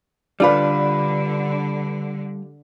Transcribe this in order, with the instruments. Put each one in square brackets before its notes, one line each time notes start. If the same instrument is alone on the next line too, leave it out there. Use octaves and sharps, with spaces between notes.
[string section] D3 [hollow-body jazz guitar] G3 F4 [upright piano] D4 B4 [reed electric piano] D5